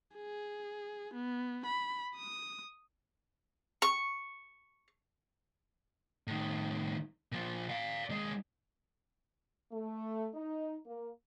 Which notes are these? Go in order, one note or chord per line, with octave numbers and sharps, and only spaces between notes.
G#4
B3
B5
D#6
C#6
A2 D#3
A#2 F3
D5 F5
D#2 G#3
A3
D#4
A#3